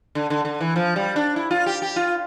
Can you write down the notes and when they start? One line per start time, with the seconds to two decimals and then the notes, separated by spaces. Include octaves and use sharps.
0.15 D3
0.30 D3
0.45 D3
0.60 E3
0.76 F3
0.96 G3
1.16 D4
1.36 E4
1.51 F4
1.66 G4
1.82 G4
1.96 F4